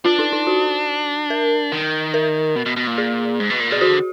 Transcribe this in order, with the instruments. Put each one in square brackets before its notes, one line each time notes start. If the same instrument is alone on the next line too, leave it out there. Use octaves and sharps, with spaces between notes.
[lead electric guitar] D4 [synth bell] F4
[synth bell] D#4
D#4
F#4
A#4
[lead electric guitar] D#3
[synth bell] A#4
[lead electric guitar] B2
B2
B2
A#2
[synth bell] G#4
[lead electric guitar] G#2
B2
A#2
[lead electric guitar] B2 [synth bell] G#4
[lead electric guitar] D3 [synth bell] F#4